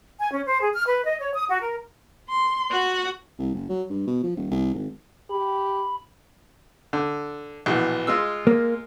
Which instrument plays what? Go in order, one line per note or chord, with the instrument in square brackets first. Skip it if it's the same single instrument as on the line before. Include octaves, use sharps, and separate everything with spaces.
[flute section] G#5
C#4
C5
G#4
F6
B4
D#5
C#5
D#6
F#4
A#4
[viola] C6
F#4 F#5
[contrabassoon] C2
F#1
F#3
G2
B2
F3
D#1
C2
G#1
[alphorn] G4 [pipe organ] B5
[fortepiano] D3
A#1 B2 E3
G#3 F4 E6
[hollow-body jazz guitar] A#3